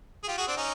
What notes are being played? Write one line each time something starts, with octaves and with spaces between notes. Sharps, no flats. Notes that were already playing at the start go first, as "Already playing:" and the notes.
G#4
F4 G4
F#4 G#4
C4 D4
C#4 D#4